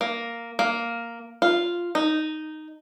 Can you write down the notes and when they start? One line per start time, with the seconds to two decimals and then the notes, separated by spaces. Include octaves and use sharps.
0.01 A#3
0.59 A#3
1.42 F4
1.95 D#4